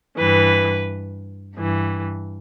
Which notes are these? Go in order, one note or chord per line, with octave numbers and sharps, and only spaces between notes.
G2 E3 B4
G2 E3